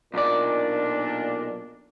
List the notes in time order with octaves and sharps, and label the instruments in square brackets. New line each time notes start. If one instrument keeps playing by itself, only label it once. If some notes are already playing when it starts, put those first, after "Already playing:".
[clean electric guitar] B1 D5 [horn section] A#2 D4